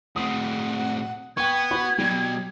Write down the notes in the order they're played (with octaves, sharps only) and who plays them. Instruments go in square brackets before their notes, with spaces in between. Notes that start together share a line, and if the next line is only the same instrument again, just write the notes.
[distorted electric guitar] A2 C4 [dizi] F#5 [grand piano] D#6
[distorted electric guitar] B3 [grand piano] G5 C#6 [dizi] G#6
[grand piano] F#4 B5
[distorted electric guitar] B2 F#3 [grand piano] G3